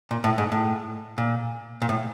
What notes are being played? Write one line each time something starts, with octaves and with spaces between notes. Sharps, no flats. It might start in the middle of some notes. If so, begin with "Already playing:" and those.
A#2
A2
G#2
A2
A#2
A#2
A2